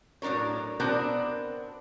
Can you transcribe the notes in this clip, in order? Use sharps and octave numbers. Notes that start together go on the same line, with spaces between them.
A2 F#3 D4 A#4 C#5
B3 C4 D4 F#4 A#4 D5